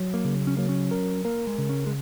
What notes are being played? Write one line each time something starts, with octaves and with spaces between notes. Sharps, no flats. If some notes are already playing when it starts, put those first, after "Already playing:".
Already playing: F#3
A#3
C#3
C#4
F#3 A#3
C#4
A#4
A#3 A#4
G#3
C#3
C#4
G#3